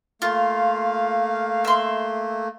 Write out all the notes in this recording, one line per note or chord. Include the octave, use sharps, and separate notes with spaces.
A3 A#3 F4 F5
E5 C6